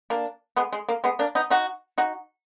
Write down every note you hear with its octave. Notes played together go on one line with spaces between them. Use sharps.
A#3 D4
G#3 B3
G#3
A#3
G#3 B3
A#3 D4
B3 D#4
D#4 F#4
D#4 F#4